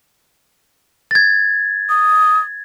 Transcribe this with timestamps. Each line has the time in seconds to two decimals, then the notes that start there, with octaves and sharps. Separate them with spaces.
1.11 G#6 A6
1.89 D#6